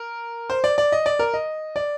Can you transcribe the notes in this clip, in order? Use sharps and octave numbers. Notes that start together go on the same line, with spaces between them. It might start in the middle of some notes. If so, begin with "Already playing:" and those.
Already playing: A#4
C5
D5
D5
D#5
D5
A#4
D#5
D5